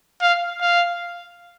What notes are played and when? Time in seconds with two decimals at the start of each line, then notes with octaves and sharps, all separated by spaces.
0.22 F5
0.61 F5